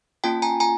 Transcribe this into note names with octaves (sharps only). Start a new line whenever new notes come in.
A#3 C#4 F4 G5 A5
G#5 A#5
G#5 A#5